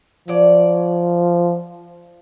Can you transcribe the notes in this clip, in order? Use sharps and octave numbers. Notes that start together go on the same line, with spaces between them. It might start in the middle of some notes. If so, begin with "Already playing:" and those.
F3 F#3 D5